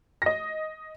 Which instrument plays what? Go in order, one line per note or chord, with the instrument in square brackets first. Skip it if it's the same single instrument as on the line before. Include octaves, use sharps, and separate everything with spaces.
[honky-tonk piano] D#5 A#6